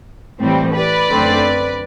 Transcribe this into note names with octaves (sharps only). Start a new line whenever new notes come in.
A2 E3 G3 C4
B4 D5
F#2 D3 A3 C4